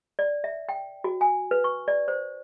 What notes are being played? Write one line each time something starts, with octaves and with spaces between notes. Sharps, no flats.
D5
E5
G5
F#4
G#5
B4
C#6
D5
C5